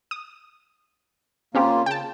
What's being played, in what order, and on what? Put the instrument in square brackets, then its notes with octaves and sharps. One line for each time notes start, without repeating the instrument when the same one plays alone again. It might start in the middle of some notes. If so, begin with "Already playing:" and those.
[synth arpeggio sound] D#6
[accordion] C#3 A#3 F4 [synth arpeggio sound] C4 C#4 G4
[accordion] C#3 [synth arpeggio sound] G5 A5